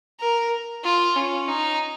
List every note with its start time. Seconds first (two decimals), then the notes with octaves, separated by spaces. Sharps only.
0.20 A#4
0.84 F4
1.16 C#4
1.48 D#4